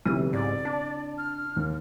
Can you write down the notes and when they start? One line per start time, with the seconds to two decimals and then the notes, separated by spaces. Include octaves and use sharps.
0.06 B1 C#3 E3 C4 E4 G4
0.33 G#2 D5
0.65 D4 A5
1.18 F6
1.56 D#2